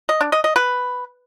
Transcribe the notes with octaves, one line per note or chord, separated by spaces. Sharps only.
D#5
D4
D#5
D#5
B4